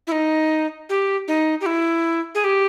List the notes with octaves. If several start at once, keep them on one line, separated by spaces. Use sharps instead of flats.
E4
D#4
G4
D#4
G4
E4
G#4
G4